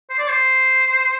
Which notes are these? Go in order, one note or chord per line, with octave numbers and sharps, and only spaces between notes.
C5
D5
C5